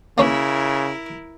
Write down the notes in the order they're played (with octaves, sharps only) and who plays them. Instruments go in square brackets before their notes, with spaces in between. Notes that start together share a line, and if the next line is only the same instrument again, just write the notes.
[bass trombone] C#3 [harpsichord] A#3 C#4 B4 [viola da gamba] E4 A#4